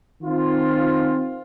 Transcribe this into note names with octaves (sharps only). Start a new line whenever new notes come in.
D#3 C4 F4